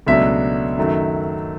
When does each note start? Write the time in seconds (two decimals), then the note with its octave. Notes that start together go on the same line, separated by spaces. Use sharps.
0.07 C#2 B2 F#3 A3 D4 E5
0.77 F#2 D#3 F#3 A3